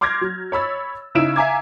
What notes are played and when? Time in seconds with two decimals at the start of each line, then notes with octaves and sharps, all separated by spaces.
0.01 C6 D6 F6 G6 G#6 A#6
0.21 F#3
0.52 C#5 B5 E6 A6
1.15 C#3 D#4 E4 D7 E7
1.36 E5 F5 G#5 A#5 D6 G#6